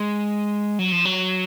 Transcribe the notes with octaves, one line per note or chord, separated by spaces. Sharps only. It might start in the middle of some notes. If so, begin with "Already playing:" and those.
Already playing: G#3
F#3
F3
F#3